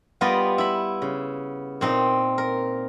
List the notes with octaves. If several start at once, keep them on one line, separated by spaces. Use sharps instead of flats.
G3 B3 F4 D5 D#5
E4 B5
C#3
A#2 C4 D#4
A#4